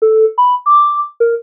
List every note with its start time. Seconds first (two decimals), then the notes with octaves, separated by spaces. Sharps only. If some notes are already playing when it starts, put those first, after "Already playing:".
0.02 A4
0.38 B5
0.66 D6
1.20 A#4